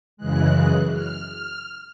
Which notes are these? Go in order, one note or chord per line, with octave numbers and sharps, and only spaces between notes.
F#2 C#3 E3 G#3 F#6
F6
F6